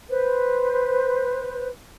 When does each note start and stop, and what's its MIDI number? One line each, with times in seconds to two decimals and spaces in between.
0.09 1.69 71
0.09 1.69 72